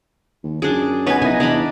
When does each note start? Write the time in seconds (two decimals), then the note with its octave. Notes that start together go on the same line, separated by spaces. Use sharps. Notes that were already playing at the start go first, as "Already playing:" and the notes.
0.43 D#2
0.62 F#2 D4 G#4
1.06 B3 D#4 B4 C#5 G#5
1.22 B1 C3 E4 G#5 A#6
1.40 E2 D4 D#5 A#5 B5